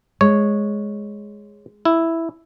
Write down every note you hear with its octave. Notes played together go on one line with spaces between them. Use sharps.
G#3 C#5
E4